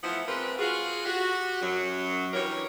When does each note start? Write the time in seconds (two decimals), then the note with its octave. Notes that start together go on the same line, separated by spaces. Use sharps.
0.04 E3 F3 A3 B3 E4 F4
0.28 G#3 C4 F4 G4 A#4 B4
0.59 F4 F#4 G#4
1.05 F#4 G4
1.62 F#2 F#3
2.34 G2 E3 G3 A#4 C#5